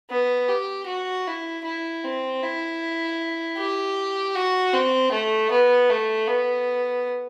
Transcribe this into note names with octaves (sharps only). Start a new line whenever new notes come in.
B3
G4
F#4
E4
E4
C4
E4
G4
F#4
C4
A3
B3
A3
B3